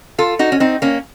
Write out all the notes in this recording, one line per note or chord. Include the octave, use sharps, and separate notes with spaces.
F4 A4
D#4 F#4
C#4
C4 D#4
A#3 C#4